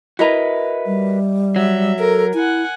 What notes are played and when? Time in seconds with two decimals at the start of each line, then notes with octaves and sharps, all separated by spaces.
0.19 E4 F#4 A#4 B4 D#5 A#5
0.87 G3
1.56 F#3 E5
1.99 A4 A#4
2.34 E4 F#5 G#5